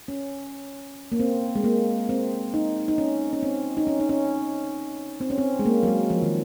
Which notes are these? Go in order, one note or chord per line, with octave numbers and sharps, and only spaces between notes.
C#4
A#3
C4
G#3
A#3
C4
D#4
D#4
C#4
C#4
C4
D#4
C#4
D#4
C#4
C4
C#4
C4
G#3
A#3
F#3
G#3
F3
D#3